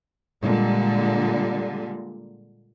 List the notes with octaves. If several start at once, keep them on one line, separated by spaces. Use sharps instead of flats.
A#2 D3 G3 G#3